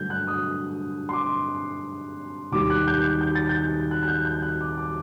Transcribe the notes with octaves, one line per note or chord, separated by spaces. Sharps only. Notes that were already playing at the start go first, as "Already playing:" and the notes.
Already playing: G2 D3 F#3 A3 G6
F#6
D#6
C6
D6
D#2 D#3 G3 D6
F#6
G6
G6
G6
A6
G6
F#6
F#6
G6
G6
F#6
D6
D6